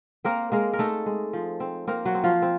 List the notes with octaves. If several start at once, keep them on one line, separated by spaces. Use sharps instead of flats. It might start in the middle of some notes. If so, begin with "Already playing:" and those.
A#3 C4 A#4
G#3 A#3 A#4
A#4
A3 D#4 A4
G#3
F3
C4
A#3 C4 A#4
F#3 F#4
C4
F3 F4
C4